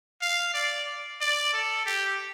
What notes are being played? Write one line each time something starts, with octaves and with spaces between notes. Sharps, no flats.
F5
D5
D5
A4
G4